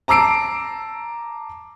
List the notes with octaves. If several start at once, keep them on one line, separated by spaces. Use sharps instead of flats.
A5 A#5 D6 E6 C7 D7